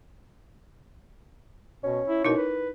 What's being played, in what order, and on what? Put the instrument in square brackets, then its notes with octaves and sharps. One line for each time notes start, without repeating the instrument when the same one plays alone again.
[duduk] B2 [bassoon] C#4
[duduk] E4
[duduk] B2 [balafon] D#4 E4 A#4
[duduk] B4